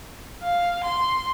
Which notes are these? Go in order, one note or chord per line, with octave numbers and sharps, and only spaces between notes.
F5
C6